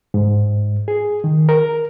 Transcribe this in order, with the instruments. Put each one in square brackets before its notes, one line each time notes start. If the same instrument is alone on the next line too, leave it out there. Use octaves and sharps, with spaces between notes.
[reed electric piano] G#2
G#4
D#3
A#4